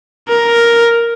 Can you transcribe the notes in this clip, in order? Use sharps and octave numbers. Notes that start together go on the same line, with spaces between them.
A#4